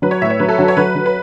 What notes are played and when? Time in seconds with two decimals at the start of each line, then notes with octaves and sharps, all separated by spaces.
0.02 F#3 B4
0.11 C#5
0.22 A2 E5
0.30 C#5
0.39 F#3 B4
0.48 A4
0.58 F#3 F#4
0.68 C#5
0.77 F#3 B4
0.95 F#3
1.06 B4